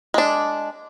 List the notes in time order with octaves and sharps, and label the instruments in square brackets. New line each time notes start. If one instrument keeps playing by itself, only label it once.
[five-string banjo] G#3 D4